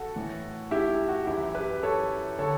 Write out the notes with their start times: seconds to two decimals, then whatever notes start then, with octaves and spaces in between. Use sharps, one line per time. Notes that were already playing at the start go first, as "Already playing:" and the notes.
Already playing: F#4 A4
0.16 A2 E3
0.71 E4 G4
0.90 E4
1.09 F#4
1.27 F#2 E3 E4 G4
1.55 G4 B4
1.83 A4 C#5
2.39 D3 A4 C#5